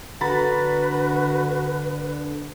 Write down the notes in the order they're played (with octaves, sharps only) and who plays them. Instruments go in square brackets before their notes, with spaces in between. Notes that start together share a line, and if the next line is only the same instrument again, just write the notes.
[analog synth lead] D3 [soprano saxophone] F#4 [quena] B4 [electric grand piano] A#5 B5 A6